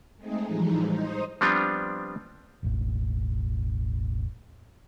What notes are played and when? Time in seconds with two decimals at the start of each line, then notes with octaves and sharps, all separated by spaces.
0.17 G#3 A3 C4 D#4 G#4
0.46 A2 E3 F3 G3 G#3 D#4
0.86 D#4 C5 D#6
1.41 F3 G3 B3 C4 D4 F4
2.63 E1 A1